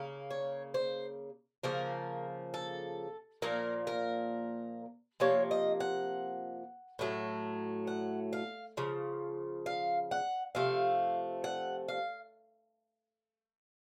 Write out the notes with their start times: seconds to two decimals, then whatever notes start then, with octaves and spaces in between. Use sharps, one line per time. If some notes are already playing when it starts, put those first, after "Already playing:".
Already playing: C#3 A#3
0.30 C#5
0.74 C5
1.63 C#3 F3 A#3 A#4
2.54 A4
3.42 A#2 F3 A#3 A#4
3.87 A#4
5.20 C3 F3 A#3 C#5
5.51 D#5
5.80 F#5
6.99 A2 F#3 A3
7.87 F#5
8.33 F5
8.77 C#3 F3
9.66 F5
10.11 F#5
10.55 C3 F3 A3 F5
11.44 F#5
11.88 F5